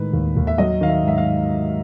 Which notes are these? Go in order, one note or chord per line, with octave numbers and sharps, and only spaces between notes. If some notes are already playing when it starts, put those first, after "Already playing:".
Already playing: A2 D#3 G#3 B4
D#2
D#2
E5
F#3 D#5
D#3 F5
E5
G#2 E5
F5